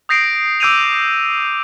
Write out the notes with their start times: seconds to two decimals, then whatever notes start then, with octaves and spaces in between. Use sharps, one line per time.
0.09 D#6 G6 A#6 C7 D7
0.60 D6 E6 G6 D7 D#7 F7